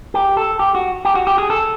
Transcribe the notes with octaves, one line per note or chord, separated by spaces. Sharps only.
G4
A4
G4
F#4
G4
F#4
G4
G#4
A4